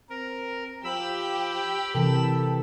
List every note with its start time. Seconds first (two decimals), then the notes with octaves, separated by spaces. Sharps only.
0.10 C4 A#4
0.84 F3 G4 B5 E6
1.95 C3 E3 A4 A#4